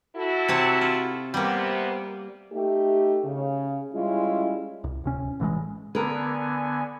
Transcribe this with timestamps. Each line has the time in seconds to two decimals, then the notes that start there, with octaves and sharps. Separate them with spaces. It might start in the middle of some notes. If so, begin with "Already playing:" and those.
0.16 E4 F#4 A4
0.49 C3 C#5 A5
0.81 F4
1.34 C3 G3 A#3 B3
2.53 A3 D#4 G4
3.25 C#3
3.92 G3 G#3 C#4 E4 F4
4.84 C2
5.04 D1 C3 C#4
5.40 A1 E3 F#3 G#3
5.95 D3 B3 A#4 B4 G#5